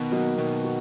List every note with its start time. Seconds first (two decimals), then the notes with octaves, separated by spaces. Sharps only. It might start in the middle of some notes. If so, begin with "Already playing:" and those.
Already playing: B2 D#3
0.11 F#3 A#3 D#4 F#4
0.37 B2 D#3
0.64 F#4